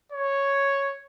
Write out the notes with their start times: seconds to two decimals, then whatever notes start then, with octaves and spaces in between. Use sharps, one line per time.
0.12 C#5